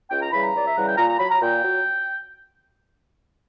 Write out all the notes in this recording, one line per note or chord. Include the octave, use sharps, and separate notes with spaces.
C#2 G5
A#5
C#3 E3 G3 B5
A#5
C#2 D5
E5
C#3 E3 G3 F#5
G5
A#2 A#5
A#5
F#3 B5
A#5
A#2 G5
F#3